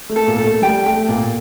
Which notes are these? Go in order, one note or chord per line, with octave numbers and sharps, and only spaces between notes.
A3
A4
A#2 A#3
A4
A3
G3 G5
A3 G5
A#2 A#3 D5